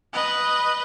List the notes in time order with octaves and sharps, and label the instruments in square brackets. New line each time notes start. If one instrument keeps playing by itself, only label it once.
[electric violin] B4 D#5